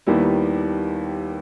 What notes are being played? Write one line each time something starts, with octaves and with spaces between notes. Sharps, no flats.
D#2 D#3 G3 B3 E4